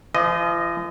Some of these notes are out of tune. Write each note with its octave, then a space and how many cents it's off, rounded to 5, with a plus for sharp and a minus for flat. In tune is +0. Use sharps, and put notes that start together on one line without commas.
F3 -45 D#5 +0